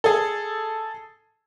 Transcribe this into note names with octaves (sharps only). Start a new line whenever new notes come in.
G#4 A4